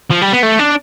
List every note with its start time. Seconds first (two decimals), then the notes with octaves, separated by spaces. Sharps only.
0.10 F3
0.21 G3
0.32 B3
0.43 A3
0.59 D4